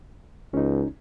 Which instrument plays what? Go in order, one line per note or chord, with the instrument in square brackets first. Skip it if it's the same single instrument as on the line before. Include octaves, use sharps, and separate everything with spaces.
[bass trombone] C#2 [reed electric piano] C#4 D#4